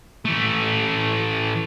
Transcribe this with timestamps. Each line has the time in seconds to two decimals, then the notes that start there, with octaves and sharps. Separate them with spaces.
0.25 E3 A3